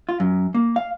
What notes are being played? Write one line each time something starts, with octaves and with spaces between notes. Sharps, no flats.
F4
F#2
A#3
F5